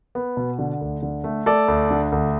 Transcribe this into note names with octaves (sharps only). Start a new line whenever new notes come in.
B3
B2
D3
D2
D3
A3
A3 A4 D5
D2
D3
D2